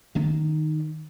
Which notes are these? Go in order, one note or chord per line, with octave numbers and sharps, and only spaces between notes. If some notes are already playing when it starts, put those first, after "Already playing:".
D#3 D#4